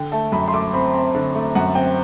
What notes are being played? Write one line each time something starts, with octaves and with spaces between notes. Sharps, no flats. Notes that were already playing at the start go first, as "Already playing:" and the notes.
Already playing: D3 G5
A3 A5
F#2 B5
C6
A3 D6
C4 B5
C4
D3
A3
F#2 F#5
C4 G5